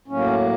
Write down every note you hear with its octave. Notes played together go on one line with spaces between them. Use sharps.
A2 F#3 A#3 C#4